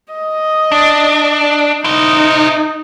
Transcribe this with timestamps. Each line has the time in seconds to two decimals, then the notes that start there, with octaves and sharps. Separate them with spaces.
0.13 D#5
0.72 D4
1.84 D#4 E4 C5